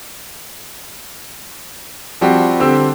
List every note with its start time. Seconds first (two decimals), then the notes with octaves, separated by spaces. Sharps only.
2.21 F3 G3 C4 F#4 G4
2.60 D3 C4 G4 E6